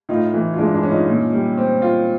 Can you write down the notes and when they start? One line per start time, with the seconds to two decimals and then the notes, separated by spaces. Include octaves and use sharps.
0.09 A2 D#4 F4
0.34 E3
0.54 F4
0.58 G#3 D4 E4
0.74 D4 E4
0.83 C#4
0.92 D#4 F4
1.08 A#2
1.33 G3
1.58 C4
1.82 F4